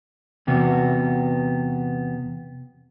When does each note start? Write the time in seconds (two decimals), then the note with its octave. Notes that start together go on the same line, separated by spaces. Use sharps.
0.47 E2 C3 B3 F#4